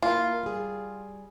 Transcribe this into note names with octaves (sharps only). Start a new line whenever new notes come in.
A#3 E4 F4 A#4
G3 G#4